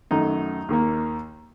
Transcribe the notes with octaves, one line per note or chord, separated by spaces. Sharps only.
F#2 D#3 A3 D#4
D#2 D#3 A#3